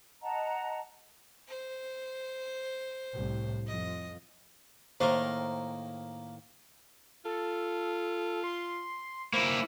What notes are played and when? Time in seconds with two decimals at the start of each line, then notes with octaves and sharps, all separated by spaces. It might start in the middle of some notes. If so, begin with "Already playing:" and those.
0.22 D#5 F#5 A5 A#5
1.48 C5
3.14 C2 A2
3.67 F2 D#5
5.00 A2 D#3 A#3 A#4 C5
7.25 F4 A4
8.44 C6
9.33 A#3 E4 C5 B5